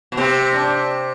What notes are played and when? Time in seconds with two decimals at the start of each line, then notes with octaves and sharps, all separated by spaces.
0.12 B2
0.17 C3 C4
0.53 D4